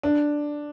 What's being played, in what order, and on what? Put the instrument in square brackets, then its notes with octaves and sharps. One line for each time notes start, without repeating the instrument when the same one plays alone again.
[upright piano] D4